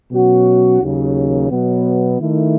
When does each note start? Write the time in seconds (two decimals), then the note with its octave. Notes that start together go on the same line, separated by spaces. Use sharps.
0.11 B2 F#3 C#4 F#4
0.82 D#2 C#3 F#3
1.50 B2 F#3 B3
2.21 D#3 A3 E4